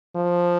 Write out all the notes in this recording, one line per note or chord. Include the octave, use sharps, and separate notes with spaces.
F3